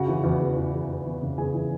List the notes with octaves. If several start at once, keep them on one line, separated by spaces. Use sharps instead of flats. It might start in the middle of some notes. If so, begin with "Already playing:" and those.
Already playing: C#3 F#4 F#5
E3
E2
E2
E2
E2
E2
E2
C#3
E2 G#4 G#5
E3